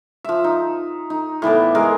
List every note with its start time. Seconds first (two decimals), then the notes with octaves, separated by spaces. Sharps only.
0.24 F3 E5
0.44 D#4
1.10 D#4
1.42 A2 E3 B3 D5
1.75 G#3 G#4 A#4 D#5